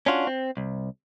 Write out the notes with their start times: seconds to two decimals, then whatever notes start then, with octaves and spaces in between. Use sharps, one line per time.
0.06 C#4 D4 F4 F#4
0.27 C4
0.57 C2